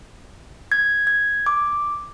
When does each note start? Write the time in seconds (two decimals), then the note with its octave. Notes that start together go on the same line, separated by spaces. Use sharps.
0.72 G#6
1.07 G#6
1.46 D6